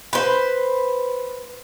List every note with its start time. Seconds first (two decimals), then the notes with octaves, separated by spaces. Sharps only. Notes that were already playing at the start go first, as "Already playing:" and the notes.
0.13 B4 C5